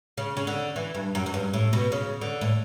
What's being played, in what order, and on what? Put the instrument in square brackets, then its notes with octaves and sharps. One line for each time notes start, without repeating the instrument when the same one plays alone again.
[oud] C#3
C#3
D3
E3
G2
F#2
F#2
G2
A2
B2
C#3
D3
A2